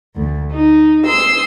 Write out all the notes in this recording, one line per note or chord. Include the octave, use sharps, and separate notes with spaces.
D2
D#4
C6 D#6 E6